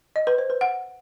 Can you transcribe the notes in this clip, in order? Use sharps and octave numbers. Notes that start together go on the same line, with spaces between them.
D#5
B4
C5
B4
F#5